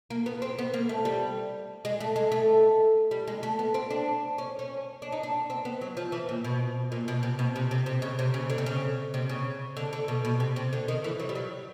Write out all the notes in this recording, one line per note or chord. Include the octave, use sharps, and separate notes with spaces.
A#3
B3
C4
B3
A#3
A3
G3
G#3
A3
G#3
A3
G3
G#3
A3
B3
C4
D4
C#4
C#4
D4
D#4
D4
C4
B3
F#3
F3
E3
A#2
B2
A#2
B2
C3
B2
C3
C3
C3
C#3
C3
C#3
D3
C3
C#3
C3
C#3
D3
D3
B2
B2
C3
C3
D3
D#3
E3
F#3
G3
F#3